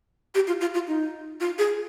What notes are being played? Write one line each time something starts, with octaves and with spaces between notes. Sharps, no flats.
G4
F4
F4
F4
D#4
F4
G#4